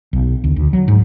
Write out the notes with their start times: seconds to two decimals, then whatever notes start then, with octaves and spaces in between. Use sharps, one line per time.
0.13 B1
0.44 D2
0.56 D2
0.73 F#3
0.88 G#2